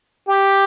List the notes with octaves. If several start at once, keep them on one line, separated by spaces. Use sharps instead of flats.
G4